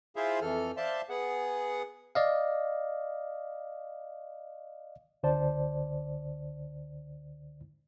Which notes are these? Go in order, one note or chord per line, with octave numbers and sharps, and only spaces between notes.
E4 F4 G#4 C5 E5 F5
F2 E3 A4 F6
C5 D5 E5 F5 A5 C6
B3 G#4 F#5
D5 D#5 F5
C#2 D3 C5 D5 A5